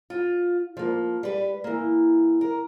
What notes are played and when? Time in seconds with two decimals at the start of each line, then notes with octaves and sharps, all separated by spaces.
0.10 F4
0.77 F3 A#3
1.23 G3 B4
1.64 E3 A#3
2.41 A#4